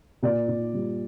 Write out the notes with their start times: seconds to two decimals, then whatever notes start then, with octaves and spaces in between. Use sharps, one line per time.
0.22 A#2 D5
0.48 A#2
0.74 G3